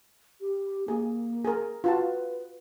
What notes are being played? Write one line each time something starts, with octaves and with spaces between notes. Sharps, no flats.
G4
A#3 G#4
G#4 A#4
F4 F#4 B4 A5